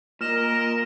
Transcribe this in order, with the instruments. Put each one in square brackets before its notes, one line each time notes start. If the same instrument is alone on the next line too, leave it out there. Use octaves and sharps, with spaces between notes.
[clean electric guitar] A#2 [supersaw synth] A#4 [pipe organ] D#5 [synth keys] F6 E7